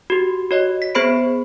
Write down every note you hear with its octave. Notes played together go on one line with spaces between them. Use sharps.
F#4 G4
F#4 C#5 D#5
B6
B3 G#4 C5 B5 C7 D7